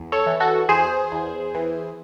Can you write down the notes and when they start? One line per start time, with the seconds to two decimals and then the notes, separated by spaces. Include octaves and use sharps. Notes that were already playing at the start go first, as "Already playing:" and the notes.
Already playing: E2
0.12 A4 C#5
0.26 E3
0.40 F#4 A4
0.69 E2 G#4 C5
1.12 E2
1.55 E3